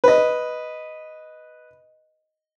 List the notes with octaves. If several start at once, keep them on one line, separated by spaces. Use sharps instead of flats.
B4 D#5